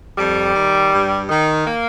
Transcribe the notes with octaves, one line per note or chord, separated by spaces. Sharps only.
F2 G3
D#3
G2
D#3
A#3